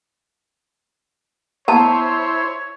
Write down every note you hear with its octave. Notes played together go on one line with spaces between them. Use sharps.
B3 E4 C5 C#5 A5 A#5